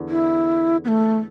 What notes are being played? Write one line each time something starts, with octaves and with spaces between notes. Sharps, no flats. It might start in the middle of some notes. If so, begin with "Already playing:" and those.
Already playing: E2 D3
E4
B3
A3